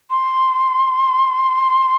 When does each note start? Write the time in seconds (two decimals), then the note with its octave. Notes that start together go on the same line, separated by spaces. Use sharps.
0.10 C6